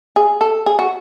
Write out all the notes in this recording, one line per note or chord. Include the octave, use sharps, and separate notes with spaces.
G#4
A4
G#4
F#4